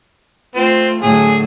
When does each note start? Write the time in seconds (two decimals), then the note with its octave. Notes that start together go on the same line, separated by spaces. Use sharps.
0.55 A3 C4 F4
1.02 A2 D3 F#3 G#4